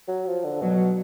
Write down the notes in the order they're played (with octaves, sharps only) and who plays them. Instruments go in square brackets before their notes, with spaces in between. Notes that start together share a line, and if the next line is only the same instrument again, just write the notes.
[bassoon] F#3
F3
D3
[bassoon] B2 [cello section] F#3